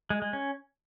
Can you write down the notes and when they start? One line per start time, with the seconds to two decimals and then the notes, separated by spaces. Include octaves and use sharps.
0.10 G#3
0.22 G#3
0.33 C#4